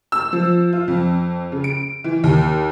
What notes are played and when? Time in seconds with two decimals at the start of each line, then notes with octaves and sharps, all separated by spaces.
0.12 E6
0.33 F3
0.73 F4
0.88 F2
1.52 C#3
1.64 D7
2.04 E3
2.24 D#2